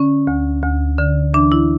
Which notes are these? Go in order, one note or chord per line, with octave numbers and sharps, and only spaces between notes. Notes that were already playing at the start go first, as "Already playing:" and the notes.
Already playing: D3 C#4
D2
D2
D3
E3 D4
E4